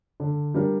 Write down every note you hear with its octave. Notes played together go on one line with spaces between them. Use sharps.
D3
G3 D4 F4 A#4